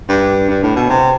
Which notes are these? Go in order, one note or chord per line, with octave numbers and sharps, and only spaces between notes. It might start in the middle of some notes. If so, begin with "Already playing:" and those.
G2
G2
A2
B2
C3